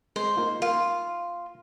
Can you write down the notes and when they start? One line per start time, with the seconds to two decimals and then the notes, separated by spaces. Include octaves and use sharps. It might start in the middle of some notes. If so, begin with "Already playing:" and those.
0.16 G#3 C5
0.37 A#3 D#4 F4
0.62 A#3 F4